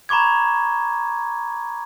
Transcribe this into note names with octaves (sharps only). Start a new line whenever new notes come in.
A#5 B5 C#6 D6 G#6